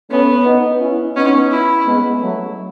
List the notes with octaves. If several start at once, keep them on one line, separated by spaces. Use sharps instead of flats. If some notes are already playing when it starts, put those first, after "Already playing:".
A3 B3 C#4
B3 D#4
C#4 E4
B3 C#4 D#4
E4
G#3 B3
F#3 A3